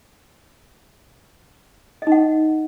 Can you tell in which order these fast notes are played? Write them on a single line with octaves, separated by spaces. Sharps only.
D#5 D#4 F#5